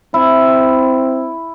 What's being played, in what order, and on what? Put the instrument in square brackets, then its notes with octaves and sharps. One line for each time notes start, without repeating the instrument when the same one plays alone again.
[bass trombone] C4 [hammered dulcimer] E4